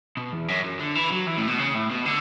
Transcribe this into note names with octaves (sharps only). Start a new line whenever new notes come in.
B2
E2
F#2
F#2
D3
E3
F#3
E3
A2
B2
C#3
A2
B2
D3